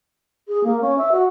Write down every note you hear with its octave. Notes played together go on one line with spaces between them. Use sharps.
G#4
A#3
C#4
E5
F#4